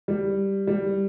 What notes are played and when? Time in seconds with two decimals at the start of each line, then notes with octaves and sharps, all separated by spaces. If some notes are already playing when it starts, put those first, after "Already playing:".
0.08 G3
0.67 G3